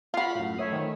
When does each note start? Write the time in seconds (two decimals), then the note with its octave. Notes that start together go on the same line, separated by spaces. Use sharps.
0.14 F4 F#4 F5 B5
0.35 F#2 A2
0.58 A3 C#5 E5 D#6
0.72 D#3 C4 C#4